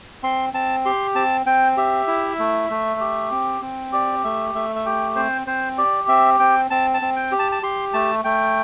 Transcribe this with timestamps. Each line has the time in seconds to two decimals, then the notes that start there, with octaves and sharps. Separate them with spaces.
0.23 C4 C6
0.53 C4 A5
0.85 G4 C6
1.15 C4 A5
1.46 C4 G5
1.77 G4 E5
2.08 E4
2.39 A3
2.70 A3
3.00 G4
3.31 C4
3.62 C4
3.92 G4 D5
4.24 A3 E5
4.55 A3 E5
4.76 E5
4.86 G4 G5
5.16 C4 C5
5.47 C4 C5
5.78 G4 D5
6.08 C4 E5
6.39 C4 G5
6.70 C4 A5
6.94 A5
7.02 C4
7.16 G5
7.32 G4
7.39 A5
7.52 A5
7.63 G4 C6
7.93 A3 A5
8.24 A3 G5